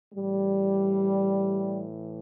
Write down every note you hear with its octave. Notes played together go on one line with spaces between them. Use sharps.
A2 E3 G3